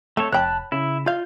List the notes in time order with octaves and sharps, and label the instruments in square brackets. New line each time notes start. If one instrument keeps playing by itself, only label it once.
[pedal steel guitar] A3 A4 C#5 [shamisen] C4
[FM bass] F1 [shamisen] C#5 G5 [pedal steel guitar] A5 B5 F#6
[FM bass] C#3 [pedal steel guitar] E4
[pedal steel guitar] F4 G6 [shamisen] D5 F5